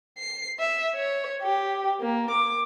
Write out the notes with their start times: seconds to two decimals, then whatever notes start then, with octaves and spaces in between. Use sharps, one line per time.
0.18 C7
0.60 E5
0.95 C#5
1.42 G4
2.00 A#3
2.31 D6